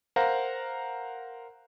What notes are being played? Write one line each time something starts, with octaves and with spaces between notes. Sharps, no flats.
A#4 C5 F5 F#5 A#5